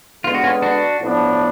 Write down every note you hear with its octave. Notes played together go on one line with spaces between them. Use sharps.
D3 G#3 B3 F4
F#4
C#4 F4
D4 F#4
A2 F3 B3 D4